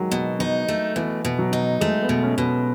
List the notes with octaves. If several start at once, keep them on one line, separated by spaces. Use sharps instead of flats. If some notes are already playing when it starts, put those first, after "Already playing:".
Already playing: D#3 F#3 G#3
B2
D#4
A3
B2 E3
B2
F#3
D#4
G#3 A3
B3
B2
C#4
B2